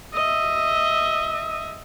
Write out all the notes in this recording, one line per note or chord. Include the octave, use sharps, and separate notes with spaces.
D#5 E5